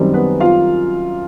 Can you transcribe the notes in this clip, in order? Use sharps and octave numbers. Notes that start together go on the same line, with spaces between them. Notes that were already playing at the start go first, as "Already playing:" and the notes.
Already playing: F#2 D#3 G3 C4
B3 B4
F4 F5